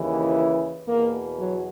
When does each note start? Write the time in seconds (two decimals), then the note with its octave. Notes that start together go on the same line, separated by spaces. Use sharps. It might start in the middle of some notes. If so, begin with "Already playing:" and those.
Already playing: D#2 C#3 E3
0.88 E2 B2 A#3
1.39 F#3